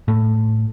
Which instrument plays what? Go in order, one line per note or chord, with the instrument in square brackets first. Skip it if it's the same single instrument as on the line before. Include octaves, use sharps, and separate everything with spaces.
[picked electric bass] A2